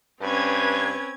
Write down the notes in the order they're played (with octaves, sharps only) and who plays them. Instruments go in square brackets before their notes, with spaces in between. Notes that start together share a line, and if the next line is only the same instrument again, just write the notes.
[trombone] G2 [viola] C4 C#4 [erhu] B4 [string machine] G#6